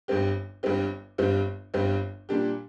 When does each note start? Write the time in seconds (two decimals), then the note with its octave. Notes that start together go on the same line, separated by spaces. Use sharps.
0.08 G1 G2 G3 C4 G4
0.63 G1 G2 G3 C4 G4
1.18 G1 G2 G3 C4 G4
1.74 G1 G2 G3 C4 G4
2.29 A#2 G3 D4 G4